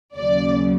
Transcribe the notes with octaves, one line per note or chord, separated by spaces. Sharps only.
D#2 C#3 F#3 D5